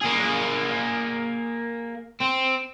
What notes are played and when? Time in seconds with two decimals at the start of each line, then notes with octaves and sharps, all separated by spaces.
0.02 A#3 G#4
2.20 C4